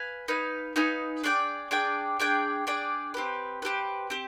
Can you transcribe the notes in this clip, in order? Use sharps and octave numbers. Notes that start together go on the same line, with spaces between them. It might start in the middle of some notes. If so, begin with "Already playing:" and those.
Already playing: B4 F5 G#5
D#4 B4 F5 G#5
D#4 B4 F5 G#5
D4 G#4 D5 G5
D4 G#4 D5 G5
D4 G#4 D5 G5
D4 G#4 D5 G5
C4 G4 B4
C4 G4 B4
C4 G4